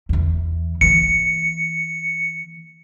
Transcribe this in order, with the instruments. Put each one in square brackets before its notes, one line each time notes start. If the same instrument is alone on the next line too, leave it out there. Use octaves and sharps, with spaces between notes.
[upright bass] E2 E3
[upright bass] E3 A#3 [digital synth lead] C#7